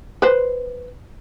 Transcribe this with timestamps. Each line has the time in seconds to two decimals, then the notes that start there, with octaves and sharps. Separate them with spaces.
0.22 B4 C5